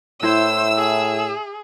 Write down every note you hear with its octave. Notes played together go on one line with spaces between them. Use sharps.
A2 E4 C5 E6
G#4